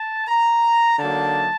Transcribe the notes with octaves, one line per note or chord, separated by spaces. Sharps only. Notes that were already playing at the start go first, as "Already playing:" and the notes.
Already playing: A5
A#5
D3 F#3 A#3 D#4 A5